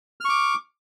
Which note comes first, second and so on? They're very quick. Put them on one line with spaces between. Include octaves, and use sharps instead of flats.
F6 C#6 D6